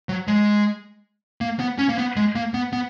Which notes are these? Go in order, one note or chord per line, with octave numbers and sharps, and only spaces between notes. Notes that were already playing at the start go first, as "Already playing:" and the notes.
F#3
G#3
A#3
B3
C#4
A#3
B3
G#3
A#3
B3
B3